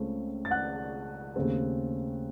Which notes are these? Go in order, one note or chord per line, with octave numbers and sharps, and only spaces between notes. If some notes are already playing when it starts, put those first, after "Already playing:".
Already playing: C#2 C#3 A3 C4
A6
F#5 F#6
D#2 C#3 A3 C4